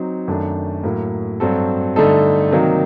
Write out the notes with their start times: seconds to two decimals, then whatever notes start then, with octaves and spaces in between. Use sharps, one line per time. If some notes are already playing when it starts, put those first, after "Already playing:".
Already playing: F#3 C4 D#4
0.28 F#2 D#3 A3 D4
0.83 A2 F#3 A#3
1.40 G2 F#3 C4 F#4 A4
1.96 G2 D3 A3 D#4 A4
2.51 C3 D#3 F#3 A#3 D#4